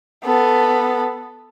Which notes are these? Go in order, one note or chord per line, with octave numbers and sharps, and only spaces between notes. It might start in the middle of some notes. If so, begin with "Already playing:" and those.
B3 A4